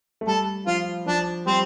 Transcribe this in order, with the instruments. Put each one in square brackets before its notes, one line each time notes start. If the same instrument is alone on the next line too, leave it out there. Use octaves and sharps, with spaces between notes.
[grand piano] A3
[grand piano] G3 [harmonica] A4
[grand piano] F3 [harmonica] F4
[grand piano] F3 [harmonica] D4
[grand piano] G3 [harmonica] C4